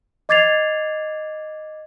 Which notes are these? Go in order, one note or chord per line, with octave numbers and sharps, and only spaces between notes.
D#5 D6 G#6 A6 C7 F7